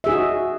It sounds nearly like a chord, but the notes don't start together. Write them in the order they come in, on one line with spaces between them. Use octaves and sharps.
E5 G#4 D#4 F#4